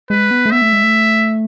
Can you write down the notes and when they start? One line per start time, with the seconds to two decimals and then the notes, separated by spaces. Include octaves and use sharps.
0.10 G#3 B4
0.31 B3
0.46 A3
0.52 B3 E5
0.62 A3
0.72 G#3
0.83 A3